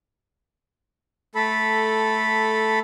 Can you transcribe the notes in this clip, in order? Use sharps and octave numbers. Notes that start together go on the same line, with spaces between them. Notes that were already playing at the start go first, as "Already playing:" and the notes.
A3 A4 B5